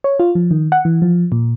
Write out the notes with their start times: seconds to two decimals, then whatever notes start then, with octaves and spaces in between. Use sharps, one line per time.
0.04 C#5
0.20 F4
0.35 F3
0.51 D#3
0.72 F#5
0.85 E3
1.02 F3
1.32 A#2